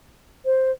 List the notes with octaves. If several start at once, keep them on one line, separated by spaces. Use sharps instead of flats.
C5